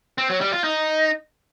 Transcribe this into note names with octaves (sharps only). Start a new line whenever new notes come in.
C4
F#3
G3
F4
D#4